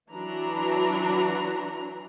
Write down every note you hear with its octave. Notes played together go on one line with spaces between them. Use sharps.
E3 F#3 D4 F#4 A#5 B5